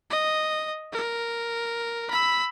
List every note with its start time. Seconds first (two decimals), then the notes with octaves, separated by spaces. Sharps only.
0.10 D#5
0.93 A#4
2.10 B5 E6